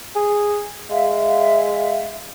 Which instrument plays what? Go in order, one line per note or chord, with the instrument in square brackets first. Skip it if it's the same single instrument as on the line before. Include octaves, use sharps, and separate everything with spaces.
[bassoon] G#4
[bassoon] G#3 [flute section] E5 F5